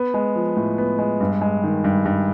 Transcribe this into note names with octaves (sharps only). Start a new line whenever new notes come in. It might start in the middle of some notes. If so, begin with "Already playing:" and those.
Already playing: B3
G#3
F3
A2
B3
G#3
G2
G#3
D#3
G2
G2